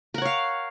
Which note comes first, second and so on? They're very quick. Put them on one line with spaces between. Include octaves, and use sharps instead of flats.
A#4 F#5 C#5 F5